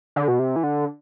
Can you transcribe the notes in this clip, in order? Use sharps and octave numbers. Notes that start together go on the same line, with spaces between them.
D3
B2
C3
E3
D3